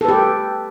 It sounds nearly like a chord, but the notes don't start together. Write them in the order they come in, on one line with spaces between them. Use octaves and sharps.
A4 B4 G4